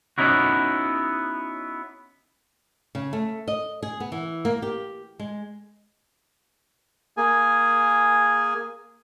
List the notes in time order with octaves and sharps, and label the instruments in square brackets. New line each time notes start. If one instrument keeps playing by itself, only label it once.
[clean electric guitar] B3 C#4 D#4 E4 F#4
[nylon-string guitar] C#3
A3
D#5
G#4
B3
E3
A#3
G4
G#3
[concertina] A#3 G#4 G#5